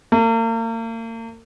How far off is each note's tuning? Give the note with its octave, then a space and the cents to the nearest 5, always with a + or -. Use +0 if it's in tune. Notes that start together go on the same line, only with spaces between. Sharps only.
A#3 -40